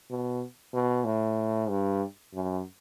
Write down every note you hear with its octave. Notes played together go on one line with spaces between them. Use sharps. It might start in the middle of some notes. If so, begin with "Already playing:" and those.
B2
B2
A2
G2
F#2